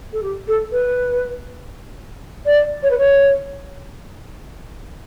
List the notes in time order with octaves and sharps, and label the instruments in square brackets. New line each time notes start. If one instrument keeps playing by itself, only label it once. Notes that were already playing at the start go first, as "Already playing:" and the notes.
[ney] A4
G4
A4
B4
D5
C#5
B4
C#5